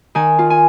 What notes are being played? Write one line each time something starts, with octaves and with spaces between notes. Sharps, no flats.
D#3 G#5
F4
G#5